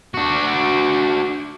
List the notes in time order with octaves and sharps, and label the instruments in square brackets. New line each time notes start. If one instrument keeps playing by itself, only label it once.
[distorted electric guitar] D4 F#4